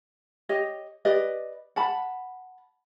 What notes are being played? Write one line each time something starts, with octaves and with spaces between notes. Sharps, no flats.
G4 C#5 D#5
G4 B4 D5 D#5
F#5 A5 B5